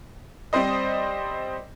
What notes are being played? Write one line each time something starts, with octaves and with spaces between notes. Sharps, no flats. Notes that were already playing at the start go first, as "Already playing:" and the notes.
G3 C4 C5 D#5